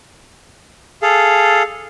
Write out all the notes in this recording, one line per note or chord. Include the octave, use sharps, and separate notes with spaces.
G#4 A4 F5